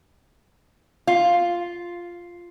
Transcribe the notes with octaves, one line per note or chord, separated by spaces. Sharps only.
F4